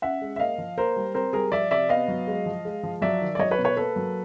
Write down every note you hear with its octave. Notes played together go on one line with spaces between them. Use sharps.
C#4 E5 F#5
G#3
E5
A#3 D#5 F5
F3
A#3 A#4 C5
G3
C4 A#4 C5
G3 G#4 A#4
F3 D5 E5
C3 D5 E5
B3 D#5 F5
F#3
G#3
F3
G#3
F3
F#3 D5 E5
D#3
D5
F#3 C#5 D#5
B4 C#5
B2
B4 C#5
A#3 A4 B4
F#3